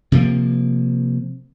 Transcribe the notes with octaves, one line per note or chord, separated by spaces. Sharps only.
C3 F3 A#3